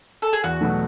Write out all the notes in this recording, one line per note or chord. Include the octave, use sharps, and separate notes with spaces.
A4
G#4
E2 F#4
B2 F#3 A3